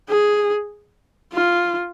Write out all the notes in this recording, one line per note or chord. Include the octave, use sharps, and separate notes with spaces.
G#4
F4